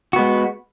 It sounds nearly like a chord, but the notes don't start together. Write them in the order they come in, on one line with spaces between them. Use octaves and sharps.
F#4 B3 G#3